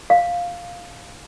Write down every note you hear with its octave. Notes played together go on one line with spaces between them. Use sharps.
F5